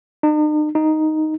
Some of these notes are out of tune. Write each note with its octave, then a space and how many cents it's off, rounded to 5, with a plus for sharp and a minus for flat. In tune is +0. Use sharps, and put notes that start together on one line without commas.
D#4 -45
D#4 +0